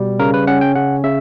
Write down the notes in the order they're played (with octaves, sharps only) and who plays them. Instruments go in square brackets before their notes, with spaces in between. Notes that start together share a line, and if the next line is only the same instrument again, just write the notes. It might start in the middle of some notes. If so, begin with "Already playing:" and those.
Already playing: [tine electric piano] B2 G3
C#3 A#4
B4
C#4 F#5
G5
C#3 F#5
C#3 E5